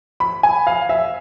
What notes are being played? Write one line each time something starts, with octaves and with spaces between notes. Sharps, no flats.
B5
G#5
F5
E5